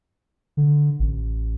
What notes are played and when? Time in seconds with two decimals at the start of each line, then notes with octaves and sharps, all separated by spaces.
0.57 D3
0.99 A1